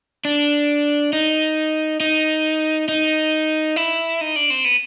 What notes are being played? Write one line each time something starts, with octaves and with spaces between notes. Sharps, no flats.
D4
D#4
D#4
D#4
E4
D#4
D4
C4
B3